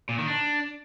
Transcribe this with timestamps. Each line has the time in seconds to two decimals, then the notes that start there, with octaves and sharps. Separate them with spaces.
0.09 A#2
0.18 D#3
0.28 D4